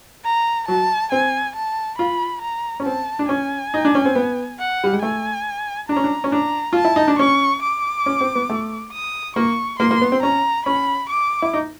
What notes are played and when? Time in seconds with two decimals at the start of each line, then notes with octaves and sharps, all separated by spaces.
0.25 A#5
0.68 F#3 A5
1.12 C4 G#5
1.56 A5
1.98 F4 B5
2.42 A#5
2.80 C#4
2.85 C4 A5
3.19 D4
3.29 C#4 G#5
3.74 D#4
3.85 D4
3.95 C#4
4.05 C4
4.15 B3
4.59 F#5
4.84 G3
4.93 G#3
5.02 A3 G#5
5.89 D4 A#5
5.96 C#4
6.04 D4
6.24 C#4
6.32 D4 A#5
6.73 F4 A5
6.85 E4
6.96 D#4
7.08 D4
7.19 C#4 C#6
7.63 D6
8.06 C#4
8.21 C4
8.35 B3
8.50 A3
8.93 D#6
9.36 A#3 C#6
9.80 A#3 C6
9.91 A#3
10.01 B3
10.12 C4
10.23 C#4 A#5
10.66 C#4 B5
11.10 D6
11.42 E4
11.54 D#4